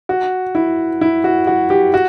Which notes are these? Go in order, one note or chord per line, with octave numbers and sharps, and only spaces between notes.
F#4
E4
E4
F#4
F#4
G4
F#4